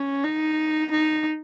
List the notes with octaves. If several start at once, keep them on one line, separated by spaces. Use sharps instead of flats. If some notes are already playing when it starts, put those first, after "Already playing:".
Already playing: C#4
D#4
D#4